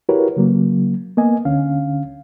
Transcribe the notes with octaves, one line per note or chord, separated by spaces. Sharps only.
E4 F#4 G4 A#4 B4 C#5
C#3 F#3 A#3
A#3 B3 D#5 G#5
D2 D3 C#4 F5